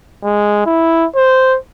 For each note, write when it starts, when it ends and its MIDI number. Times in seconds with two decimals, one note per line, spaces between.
0.25 0.63 56
0.66 1.06 64
1.16 1.58 72